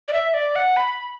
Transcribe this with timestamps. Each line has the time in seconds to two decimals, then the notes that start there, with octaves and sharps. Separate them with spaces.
0.08 D5
0.13 E5
0.34 D5
0.56 F#5
0.77 B5